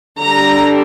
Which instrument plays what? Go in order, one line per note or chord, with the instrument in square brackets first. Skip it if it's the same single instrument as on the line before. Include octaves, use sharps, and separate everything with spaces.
[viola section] D3 G3 D4 A#5